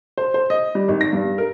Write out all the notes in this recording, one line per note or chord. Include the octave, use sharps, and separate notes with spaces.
C5
C5
D#5
G3
G#1
A#6
G2
A#4